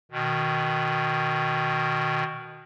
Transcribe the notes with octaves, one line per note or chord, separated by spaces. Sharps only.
B2 D#3